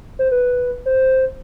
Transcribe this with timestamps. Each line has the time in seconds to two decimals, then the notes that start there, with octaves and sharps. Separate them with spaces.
0.19 C5
0.32 B4
0.86 C5